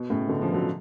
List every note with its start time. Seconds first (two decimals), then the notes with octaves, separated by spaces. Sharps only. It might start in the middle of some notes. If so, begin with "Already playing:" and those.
Already playing: B2
0.10 A2 C#3
0.28 B2 D3
0.41 C#3 F3
0.53 D3 F#3